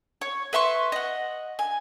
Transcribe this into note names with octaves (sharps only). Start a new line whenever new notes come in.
C#5
B4 E5 C6 C#6
D#5 F#5
G#5